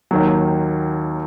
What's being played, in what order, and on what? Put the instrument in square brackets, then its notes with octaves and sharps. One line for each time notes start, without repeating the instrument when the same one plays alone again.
[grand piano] D#2 D#3 F#3